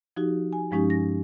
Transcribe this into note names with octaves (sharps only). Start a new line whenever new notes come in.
F3 D#4 F#4 G4
G#5
G2 F3 G#3 C#4 D#4 G4
A#6